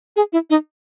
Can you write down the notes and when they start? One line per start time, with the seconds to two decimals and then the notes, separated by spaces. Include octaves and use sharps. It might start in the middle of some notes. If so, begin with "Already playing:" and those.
0.16 G#4
0.33 E4
0.50 D#4